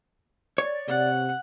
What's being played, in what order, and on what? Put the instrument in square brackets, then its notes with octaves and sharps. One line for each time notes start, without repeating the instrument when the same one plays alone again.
[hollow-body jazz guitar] C#5 [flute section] D5
[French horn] C3 [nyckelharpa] F#5